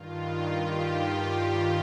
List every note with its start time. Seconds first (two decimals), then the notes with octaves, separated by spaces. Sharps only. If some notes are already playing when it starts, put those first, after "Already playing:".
Already playing: G2 D#3 F4
0.58 G4